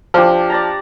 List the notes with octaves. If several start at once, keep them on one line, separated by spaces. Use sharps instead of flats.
F3 D4 G4
D5 A5 A#5